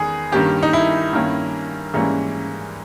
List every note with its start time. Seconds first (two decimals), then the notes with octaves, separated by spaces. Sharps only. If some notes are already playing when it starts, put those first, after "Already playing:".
Already playing: E2 D#3 G#3 B3 G#4
0.32 G2 D#3 A#3 C#4 G4
0.63 D#4
0.73 E4
1.13 G2 D#3 A#3 C#4
1.94 G#2 E3 G3 A#3 C#4